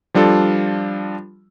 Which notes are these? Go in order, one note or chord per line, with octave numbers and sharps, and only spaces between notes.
F3 G3 D4 F4 A4